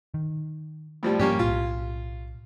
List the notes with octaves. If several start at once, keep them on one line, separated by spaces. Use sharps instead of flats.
D#3
A2 F3 G3
G#2 F3 G3 A#3 C#4 G4
B1 A2 F4